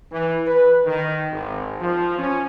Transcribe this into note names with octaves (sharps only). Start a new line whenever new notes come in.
E3
B4
D#3
G#1
F3
C#4